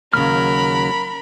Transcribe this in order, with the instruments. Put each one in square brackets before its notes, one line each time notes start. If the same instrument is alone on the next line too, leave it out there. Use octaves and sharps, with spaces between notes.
[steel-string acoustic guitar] D#2 C#3 [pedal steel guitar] F#3 F6 [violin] A#4 B5